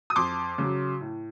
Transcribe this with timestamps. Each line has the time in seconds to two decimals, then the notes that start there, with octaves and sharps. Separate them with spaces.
0.10 D#6
0.16 F2 C6 D6
0.58 C#3 F#3
1.01 A2